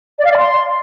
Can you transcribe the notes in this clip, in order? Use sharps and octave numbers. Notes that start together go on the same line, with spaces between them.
D5
F5
D5
C6